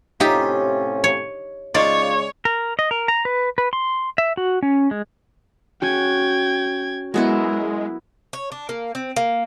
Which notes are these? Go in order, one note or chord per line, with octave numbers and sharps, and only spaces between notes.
A2 C3 C#4 D#4 F4 G4 E5
C#5
C#3 G#3 D#4 F4 C#5 D5
A#4
D#5
A#4
A#5
B4
B4
C6
E5
F#4
C#4
G#3
C#4 F#4 G5 G#6
F#3 G#3 B3 E4 A#4
C#5
D4
A#3
C4
A#3